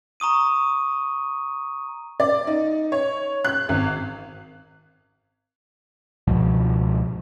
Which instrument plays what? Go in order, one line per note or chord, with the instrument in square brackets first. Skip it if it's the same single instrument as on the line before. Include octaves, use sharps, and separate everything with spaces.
[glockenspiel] A#5 C#6 D#6 D#7
[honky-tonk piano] D5
D#4
C#5
F#6
G#1
[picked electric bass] C#2 G#2 B2 F3